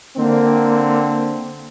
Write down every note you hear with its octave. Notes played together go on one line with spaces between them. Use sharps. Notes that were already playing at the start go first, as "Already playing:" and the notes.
D3 A#3 C4